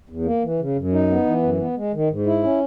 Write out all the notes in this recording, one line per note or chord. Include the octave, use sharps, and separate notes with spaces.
E2
A#3
E3
C#3
F#2
D#4
B3
E3
F#2
B3
G#3
D#3
G#2
E4
C#4